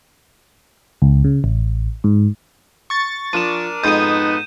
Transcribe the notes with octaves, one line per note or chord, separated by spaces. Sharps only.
C#2
C#3
A1
G#2
C#6 A6
F3 D4 A#4 D#7 E7
F2 G#2 B3 D#4 D#6 G6 D#7